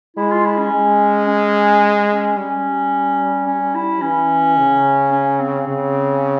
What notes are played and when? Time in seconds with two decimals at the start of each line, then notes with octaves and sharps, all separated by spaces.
0.17 G#3 E4
0.31 F4
0.45 E4
0.58 C#4
0.72 G#3
1.27 C#4
2.10 C#4
2.37 G3 C#4
3.47 C#4
3.75 E4
4.02 E3 C#4
4.57 C#3
5.12 C#4
5.39 C4
5.68 C#3